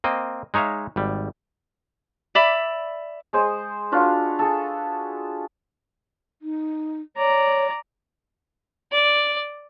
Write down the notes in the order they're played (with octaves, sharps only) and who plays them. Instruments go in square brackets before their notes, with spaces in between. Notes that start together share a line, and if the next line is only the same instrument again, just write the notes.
[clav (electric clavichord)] A#3 C4 D#5
G#3 D#4 C#5 E5 F5
G#1 G3
[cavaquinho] D5 E5 B5 D6
[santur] G#3 G#4 C5 D#6
D4 F4 F#4 B4
G#4 A4
[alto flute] D#4
[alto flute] C#5 [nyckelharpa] D5 A#5
[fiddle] D5